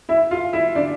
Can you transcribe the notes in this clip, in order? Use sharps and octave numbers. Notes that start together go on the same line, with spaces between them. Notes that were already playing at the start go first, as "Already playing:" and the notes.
E4 E5
F4 F5
E4 E5
D4 D5